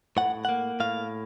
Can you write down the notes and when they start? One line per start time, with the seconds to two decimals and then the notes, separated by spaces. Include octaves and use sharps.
0.17 A2 F#5
0.45 A#3 F#5
0.80 A2 F5